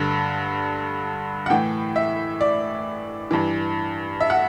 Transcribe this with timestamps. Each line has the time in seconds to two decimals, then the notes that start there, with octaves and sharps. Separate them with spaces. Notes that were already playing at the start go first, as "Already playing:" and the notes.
Already playing: G2 D3
1.46 F#5
1.50 A2 E3 G5
1.96 E5
2.41 D5
3.31 G2 E3
4.21 E5
4.30 F#5